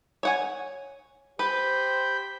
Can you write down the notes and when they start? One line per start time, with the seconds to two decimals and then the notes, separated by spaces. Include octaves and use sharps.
0.23 C#5 F#5 G#5
1.39 G4 B4 C5 G5 B5